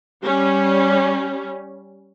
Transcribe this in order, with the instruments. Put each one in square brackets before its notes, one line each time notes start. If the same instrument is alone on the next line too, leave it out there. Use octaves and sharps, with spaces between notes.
[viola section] G3 C#4